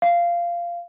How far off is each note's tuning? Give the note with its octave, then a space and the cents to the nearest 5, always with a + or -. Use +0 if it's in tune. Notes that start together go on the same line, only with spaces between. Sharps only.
F5 -15